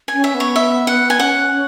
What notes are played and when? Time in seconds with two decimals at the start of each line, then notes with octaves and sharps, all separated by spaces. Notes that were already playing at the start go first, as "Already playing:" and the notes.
0.08 G#5
0.13 C#4
0.24 E5
0.35 B3
0.40 C#5
0.56 E5
0.87 F#5
1.10 G#5
1.20 C#4 F#5